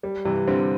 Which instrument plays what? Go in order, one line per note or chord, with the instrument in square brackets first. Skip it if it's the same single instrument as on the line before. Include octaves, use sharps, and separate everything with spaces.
[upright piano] G3
[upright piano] G2 [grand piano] C3 E3
[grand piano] D3 G3 [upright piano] C4